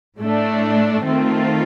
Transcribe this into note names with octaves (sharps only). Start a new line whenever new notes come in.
A2 A3 D4
D#3 A3 C4 F4